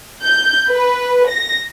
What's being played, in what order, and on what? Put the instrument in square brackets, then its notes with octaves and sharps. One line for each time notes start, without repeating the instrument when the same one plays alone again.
[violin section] G6
B4
A#6